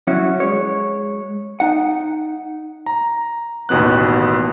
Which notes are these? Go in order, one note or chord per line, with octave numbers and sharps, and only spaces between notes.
F#3 C#4 E4 F#4
G#3 C#5
D#4 F#5
A#5
A1 D#2 B2 B3 F#6